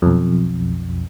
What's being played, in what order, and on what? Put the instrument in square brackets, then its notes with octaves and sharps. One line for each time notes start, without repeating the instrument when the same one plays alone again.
[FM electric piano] B1 F2